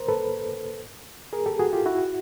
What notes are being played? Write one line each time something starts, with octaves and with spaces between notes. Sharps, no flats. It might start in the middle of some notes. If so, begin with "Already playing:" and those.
Already playing: A#4 C5
A4 B4
G#4 A#4
G4 A4
F#4 G#4
F4 G4
E4 F#4